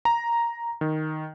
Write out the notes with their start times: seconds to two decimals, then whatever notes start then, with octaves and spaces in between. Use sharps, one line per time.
0.05 A#5
0.81 D#3